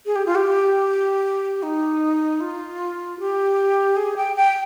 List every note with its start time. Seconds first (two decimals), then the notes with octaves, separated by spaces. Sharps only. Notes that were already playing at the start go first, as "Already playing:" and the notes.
0.06 G#4
0.16 G4
0.26 F4
0.35 G4
1.63 D#4
2.40 F4
3.19 G4
3.97 G#4
4.17 G5
4.36 G5